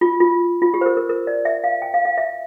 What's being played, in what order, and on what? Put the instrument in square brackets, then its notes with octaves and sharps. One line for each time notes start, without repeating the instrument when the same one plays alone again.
[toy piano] F4
F4
F4
G4
C5
A#4
A#4
A#4
D5
E5
F5
G5
F5
F5
E5